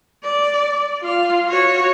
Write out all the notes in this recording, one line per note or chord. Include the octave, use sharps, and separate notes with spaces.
D5
F4 F5
F#4 C#5